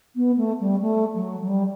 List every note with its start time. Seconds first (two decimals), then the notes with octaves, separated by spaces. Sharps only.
0.16 B3
0.37 A3
0.60 G3
0.81 A3
1.14 F#3
1.40 F#3
1.47 G3